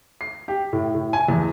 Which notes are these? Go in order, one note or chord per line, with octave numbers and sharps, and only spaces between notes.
C7
G4
A2
A2
G#5
E2